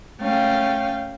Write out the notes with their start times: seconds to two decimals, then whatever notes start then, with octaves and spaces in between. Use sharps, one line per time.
0.20 A3 C#4 F5 G5